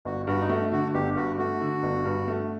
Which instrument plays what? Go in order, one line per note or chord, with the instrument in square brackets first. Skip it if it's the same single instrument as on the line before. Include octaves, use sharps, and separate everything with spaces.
[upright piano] G1 [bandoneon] F#4
[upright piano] G2 [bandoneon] F#4
[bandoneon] D#4
[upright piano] A3 [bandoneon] F#4
[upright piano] D3 [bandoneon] F#4
[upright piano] G1 [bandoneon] G4
[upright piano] G2 [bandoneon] F#4
[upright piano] A3 [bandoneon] F#4
[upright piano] D3
G1
G2
A3